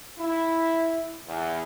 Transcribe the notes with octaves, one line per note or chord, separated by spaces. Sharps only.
E4
E2